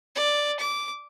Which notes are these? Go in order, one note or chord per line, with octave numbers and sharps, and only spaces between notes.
D5
D6